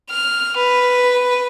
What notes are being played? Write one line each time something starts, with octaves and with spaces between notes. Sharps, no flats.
F6
B4